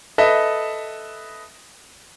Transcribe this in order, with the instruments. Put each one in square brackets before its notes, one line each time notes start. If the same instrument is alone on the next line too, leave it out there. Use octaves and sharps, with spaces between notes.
[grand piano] A4 B4 D#5 E5